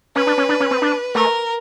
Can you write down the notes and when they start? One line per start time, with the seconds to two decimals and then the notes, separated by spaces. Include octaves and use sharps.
0.16 C#4 B4
0.27 D4
0.38 C#4
0.49 D4
0.60 C#4
0.71 C4
0.82 D4
1.15 A3 A#4